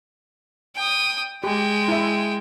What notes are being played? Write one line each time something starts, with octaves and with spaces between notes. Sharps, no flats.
G5 D#6
G#3 G4 G5
E4 E5